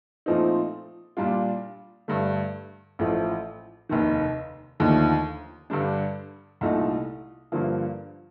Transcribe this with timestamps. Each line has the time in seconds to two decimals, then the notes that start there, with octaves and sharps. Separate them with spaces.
0.26 A#2 F3 A3 C4 D#4
1.17 A#2 G3 D4 F4
2.08 G2 D3 A3
2.99 A1 A2 F3 A3
3.89 F1 D#2 D#3
4.80 D#2 D3 F3 A3 D#4
5.70 G2 D3 G3 D4
6.61 C2 A#2 A3 D#4
7.52 G2 D3 F3 A#3